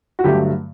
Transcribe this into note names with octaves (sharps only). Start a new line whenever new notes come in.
F#4
G2 D3 F#3 A3 G4